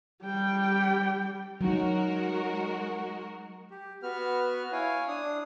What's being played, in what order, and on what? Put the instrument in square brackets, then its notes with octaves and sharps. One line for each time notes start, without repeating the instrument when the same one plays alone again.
[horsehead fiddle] G3 G5
[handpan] F#3 D#4 [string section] G#3 F#4 A#4
[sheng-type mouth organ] G4
B3 F#4 B4 F6
E4 C#5 F5 G#5
D4 D#6